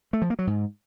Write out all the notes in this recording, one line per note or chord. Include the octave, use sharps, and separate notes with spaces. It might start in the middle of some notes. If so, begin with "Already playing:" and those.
A3
F3
A#3
F#3
G#2